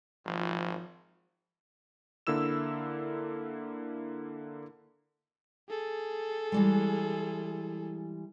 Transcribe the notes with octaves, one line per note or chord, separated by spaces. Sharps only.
G#1 F3
D3 A#3 E4 E6 E7
G#4 A4
E3 G3 G#3